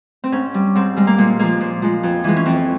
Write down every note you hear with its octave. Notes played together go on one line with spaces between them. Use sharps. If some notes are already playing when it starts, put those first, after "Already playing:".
C4
G#2 C#4
G3
G#2 C4
G3 G#3
A#3
A#2 G#3
F3 G#3 A#3
A#2
F3 G#3
F2
E3 G#3
C#4
F2 C4